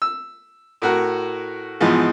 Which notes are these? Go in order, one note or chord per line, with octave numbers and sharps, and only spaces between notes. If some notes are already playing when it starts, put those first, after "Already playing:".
E6
A2 F#4 A#4
G#2 B2 E3 F3